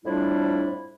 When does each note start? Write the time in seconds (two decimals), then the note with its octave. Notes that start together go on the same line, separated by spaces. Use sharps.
0.05 F2 A2 G3 D4 E4 F4